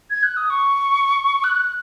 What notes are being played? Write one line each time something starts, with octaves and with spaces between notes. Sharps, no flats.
G#6
F#6
D#6
C#6
F#6